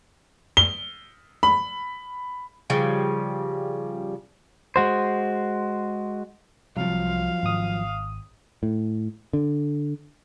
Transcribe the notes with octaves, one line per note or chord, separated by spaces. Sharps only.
G7
B5
C#3 F3 G3
G#3 F#4 C5
C2 F3 F#3 F5
G#1 D#6
A2
D3